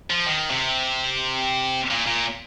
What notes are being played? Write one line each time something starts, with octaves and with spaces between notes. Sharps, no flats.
F3
D#3
C3
A#2
A#2